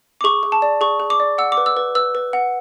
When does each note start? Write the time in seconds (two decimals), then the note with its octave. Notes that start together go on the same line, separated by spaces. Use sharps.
0.21 D6
0.24 G#4 C#6
0.43 G#4
0.52 A5
0.62 D5
0.81 G#4 C#6
1.00 G#4
1.10 D6
1.20 D5
1.38 F#5 E6
1.52 D6
1.57 B4
1.66 E6
1.77 B4
1.95 B4 E6
2.15 B4
2.33 F#5